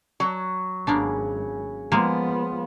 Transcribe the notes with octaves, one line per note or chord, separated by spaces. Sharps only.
F#3
G#1 C#3 A#3 B3 D4
F3 G#3 A#3 B3 F4